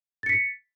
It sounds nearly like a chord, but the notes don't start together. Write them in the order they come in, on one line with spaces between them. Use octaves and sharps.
A6 C#7 B6